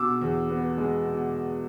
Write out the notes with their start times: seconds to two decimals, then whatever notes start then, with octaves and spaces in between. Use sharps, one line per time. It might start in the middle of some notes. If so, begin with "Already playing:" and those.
Already playing: B2 D6 E6
0.21 E2
0.49 B3
0.77 G#3
1.06 B2